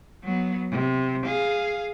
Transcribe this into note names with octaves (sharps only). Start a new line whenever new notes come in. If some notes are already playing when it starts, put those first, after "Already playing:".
F#3 B3
C3
G#4 F5